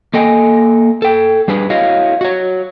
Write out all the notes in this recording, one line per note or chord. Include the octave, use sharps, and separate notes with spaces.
A#3 A4 D#5 G5 G#5
A4 G5
G3 D4 G#4 B4
E4 F#4 C#5 D#5 F5
F#4 C#5